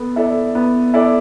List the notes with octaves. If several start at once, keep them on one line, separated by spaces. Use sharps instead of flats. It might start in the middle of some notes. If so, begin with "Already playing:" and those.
Already playing: B3 A4
E4 A4 D5
B3
E4 A4 D5